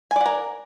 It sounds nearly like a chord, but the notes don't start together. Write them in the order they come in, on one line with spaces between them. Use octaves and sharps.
G#5 D5 F#5 A#4